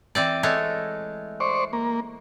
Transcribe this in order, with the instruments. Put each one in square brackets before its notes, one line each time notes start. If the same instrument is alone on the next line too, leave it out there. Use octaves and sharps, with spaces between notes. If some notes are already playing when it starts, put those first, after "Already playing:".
[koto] E3 C4 D5
G#3 A3 C#5
[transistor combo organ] C5 D5 C#6
A#3